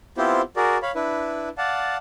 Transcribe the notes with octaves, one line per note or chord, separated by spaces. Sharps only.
B3 C4 E4 F4 G4 C5
F#4 G#4 A#4 D5
C#5 F5 B5
D4 E4 B4
D5 F5 F#5 A5